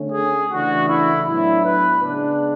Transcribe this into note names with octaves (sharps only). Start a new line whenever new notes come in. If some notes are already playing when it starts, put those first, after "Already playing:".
Already playing: D3 A3 C#4
G#4
C#3 E3 A3 D4 F#4
E4
A2 F#3 B3 D4 E4
B4
C#3 G#3 B3 D4